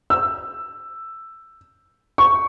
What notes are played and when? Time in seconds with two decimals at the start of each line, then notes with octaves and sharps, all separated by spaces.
0.10 E6
2.18 C#6